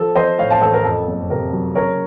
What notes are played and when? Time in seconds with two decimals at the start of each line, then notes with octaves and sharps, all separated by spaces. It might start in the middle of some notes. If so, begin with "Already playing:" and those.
Already playing: F3 A4
0.15 F3 C5 D#5
0.38 A2 C#5 F5
0.50 F5 A5
0.61 A1 A4 C5
0.73 A#4
0.84 F2 A4
1.07 F#1
1.30 C3 A#4
1.53 F#3
1.75 C#3 A#4 C#5